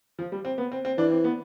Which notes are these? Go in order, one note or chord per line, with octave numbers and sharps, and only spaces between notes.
F3
G3
C4
B3
C4
C4
E3 D4
C4
B3